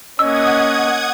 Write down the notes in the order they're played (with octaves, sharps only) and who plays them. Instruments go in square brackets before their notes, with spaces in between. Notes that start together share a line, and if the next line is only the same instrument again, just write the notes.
[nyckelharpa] A#3 C#4 [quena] D#5 [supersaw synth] F#5 D#6 G#6 [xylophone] E6